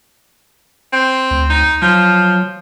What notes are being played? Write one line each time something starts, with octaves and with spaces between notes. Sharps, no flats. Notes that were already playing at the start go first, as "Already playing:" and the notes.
C4
D2
D#4
F3 F#3